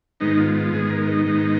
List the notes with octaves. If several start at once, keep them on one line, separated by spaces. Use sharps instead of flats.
G#2 D#3 G#3 B3 D#4
F4
F4
G#2 D#3 G#3 B3 G#4
A#4
D#4
G#2 D#3 G#3 B3